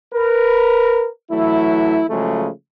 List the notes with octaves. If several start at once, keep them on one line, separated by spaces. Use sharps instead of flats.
A#4 B4
E3 F#3 A3 E4
C#3 F3 F#3 G#3 A3